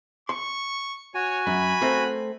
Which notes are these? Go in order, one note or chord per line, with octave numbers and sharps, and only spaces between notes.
C6 C#6
F#4 C#5 G#5
F#2 B5
A3 C4 A#4